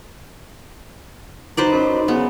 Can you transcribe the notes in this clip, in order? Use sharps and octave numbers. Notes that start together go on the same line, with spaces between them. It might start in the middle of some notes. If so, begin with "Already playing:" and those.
F#3 D#4 B4 C5 D5
F#2
C#3 B3